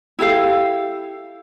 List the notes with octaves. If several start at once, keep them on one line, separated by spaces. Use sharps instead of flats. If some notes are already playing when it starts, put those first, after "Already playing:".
E4 G4 A4 F5